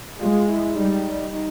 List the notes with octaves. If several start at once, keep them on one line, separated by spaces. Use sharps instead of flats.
G#3 F4
E4
G3 D#4
D#4